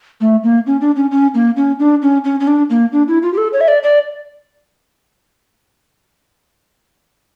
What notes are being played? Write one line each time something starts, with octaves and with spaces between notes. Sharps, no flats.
A3
A#3
C#4
D4
C#4
C#4
A#3
C#4
D4
C#4
C#4
C#4
D4
A#3
D4
E4
F4
G4
A4
C#5
E5
D5
D5